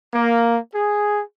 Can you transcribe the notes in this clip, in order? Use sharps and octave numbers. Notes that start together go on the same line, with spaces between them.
A#3
G#4